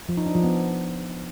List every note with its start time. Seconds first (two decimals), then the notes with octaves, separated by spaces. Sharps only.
0.09 F3
0.17 D#4
0.26 D4
0.35 F3
0.44 B3